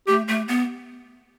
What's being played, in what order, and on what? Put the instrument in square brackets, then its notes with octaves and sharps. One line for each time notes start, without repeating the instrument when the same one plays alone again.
[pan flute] A3 [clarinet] G4
[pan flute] A3
B3